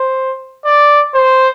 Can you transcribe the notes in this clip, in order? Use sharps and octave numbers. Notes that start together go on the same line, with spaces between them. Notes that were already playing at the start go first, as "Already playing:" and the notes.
Already playing: C5
D5
C5